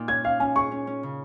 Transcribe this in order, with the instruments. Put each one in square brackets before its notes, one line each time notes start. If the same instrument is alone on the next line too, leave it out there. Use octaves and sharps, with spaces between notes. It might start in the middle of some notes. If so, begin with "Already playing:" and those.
Already playing: [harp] A#2 D#4
[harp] C#4 [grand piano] G#6
[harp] C#4 [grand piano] F5
[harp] C#4 [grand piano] G#5
[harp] G#4 [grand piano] C#6
[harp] C#4
C#4
C#3